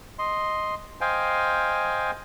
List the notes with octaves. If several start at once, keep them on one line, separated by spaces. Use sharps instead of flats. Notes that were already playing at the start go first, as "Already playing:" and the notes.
D#5 C6
C5 D#5 F5 G5 G#5